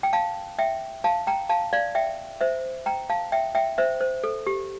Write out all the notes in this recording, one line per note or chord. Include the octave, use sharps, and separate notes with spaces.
G5
F5 A5
E5 G5
F5 A5
G5 A#5
F5 A5
D5 F5
E5 G5
C5 E5
G5 A#5
F5 A5
E5 G5
E5 G5
C5 E5
C5
A4
G4